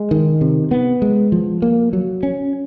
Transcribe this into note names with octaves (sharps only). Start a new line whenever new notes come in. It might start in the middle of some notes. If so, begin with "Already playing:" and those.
Already playing: G#3
D#3
C3
B3
G#3
F3
A#3
F#3
C#4